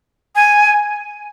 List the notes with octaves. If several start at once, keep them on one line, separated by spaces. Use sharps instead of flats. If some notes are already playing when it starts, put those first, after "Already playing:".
G#5